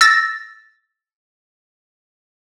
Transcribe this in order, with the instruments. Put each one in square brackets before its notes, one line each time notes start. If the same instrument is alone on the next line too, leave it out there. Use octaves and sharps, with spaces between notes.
[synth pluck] E6 A6 A#6